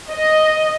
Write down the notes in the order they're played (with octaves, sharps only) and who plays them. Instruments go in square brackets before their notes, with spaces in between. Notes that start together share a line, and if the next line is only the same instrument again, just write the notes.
[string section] D#5